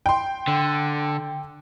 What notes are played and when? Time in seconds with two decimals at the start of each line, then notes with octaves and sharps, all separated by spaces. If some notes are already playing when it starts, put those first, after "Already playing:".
0.06 G5 C6
0.48 D3